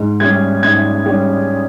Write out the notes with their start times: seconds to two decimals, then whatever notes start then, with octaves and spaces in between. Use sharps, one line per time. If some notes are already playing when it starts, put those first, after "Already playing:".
Already playing: G#2
0.20 G3 C#4 G#6
0.63 G#2 G#6
1.06 G3 C#4